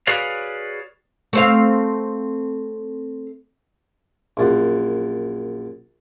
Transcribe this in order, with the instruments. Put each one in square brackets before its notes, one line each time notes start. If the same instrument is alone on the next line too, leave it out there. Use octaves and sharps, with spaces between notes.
[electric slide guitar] F#4 G#4 B4 C#5 D5 F5
[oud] A3 C4 F5
[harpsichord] A#1 F#2